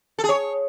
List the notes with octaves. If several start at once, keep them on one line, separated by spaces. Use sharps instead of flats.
A4
G#4
C#5